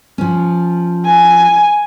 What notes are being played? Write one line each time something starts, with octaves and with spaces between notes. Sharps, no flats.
F3 C#4
G#5